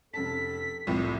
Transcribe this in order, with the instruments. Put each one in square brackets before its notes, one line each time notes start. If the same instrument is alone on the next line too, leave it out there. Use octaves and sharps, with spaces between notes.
[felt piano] F1 C#4 A5 [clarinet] A4 [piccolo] B6
[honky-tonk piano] C2 A2 C3 [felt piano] F2 F3